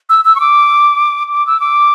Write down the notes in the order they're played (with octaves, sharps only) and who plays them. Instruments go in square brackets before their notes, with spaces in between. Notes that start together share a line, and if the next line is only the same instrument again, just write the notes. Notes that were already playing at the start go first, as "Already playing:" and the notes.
[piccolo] E6
E6
C#6
D6
D6
E6
D6